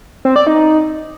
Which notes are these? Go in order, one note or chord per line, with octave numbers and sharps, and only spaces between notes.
C4
D5
D#4